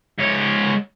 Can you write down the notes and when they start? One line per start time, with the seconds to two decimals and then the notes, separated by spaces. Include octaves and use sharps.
0.18 G#2 C#5